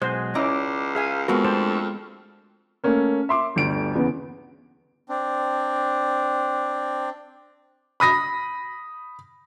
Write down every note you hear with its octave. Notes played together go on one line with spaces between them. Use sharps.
B1 G#3 F#4 G#4 C5
C#2 C#4 E4 D5 D#5 A#5 D6
G#4 E5 F5 G#5
F2 G#3 B3 F#4 A#4
A3 D4 C5 A5
A3 A#3 C#4 A#4
E5 C6 D6
G1 D2 D7
E2 C#3 B3
C4 D4
B5 D#6 A#6